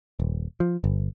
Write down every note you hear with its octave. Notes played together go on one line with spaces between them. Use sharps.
D#1
F3
G1